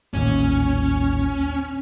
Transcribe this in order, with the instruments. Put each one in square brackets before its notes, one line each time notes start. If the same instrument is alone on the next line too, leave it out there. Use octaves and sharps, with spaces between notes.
[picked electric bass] A1 D#2 A#2 [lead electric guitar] C#4